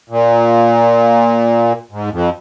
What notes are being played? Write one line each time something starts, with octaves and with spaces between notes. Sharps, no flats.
A#2
G#2
F2